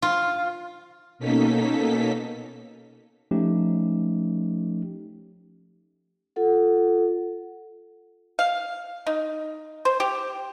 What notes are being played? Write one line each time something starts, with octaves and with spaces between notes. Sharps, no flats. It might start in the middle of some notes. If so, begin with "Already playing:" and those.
F4
B2 A#3 C#4 D#4 A4 B6
F3 A3 C#4 D#4 G4
F4 A4 F#5
F5
D#4
C5
G4